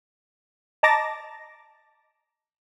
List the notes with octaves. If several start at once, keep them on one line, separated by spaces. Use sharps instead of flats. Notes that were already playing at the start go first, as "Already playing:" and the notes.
D#5 A5 A#5 D6 A6 A#6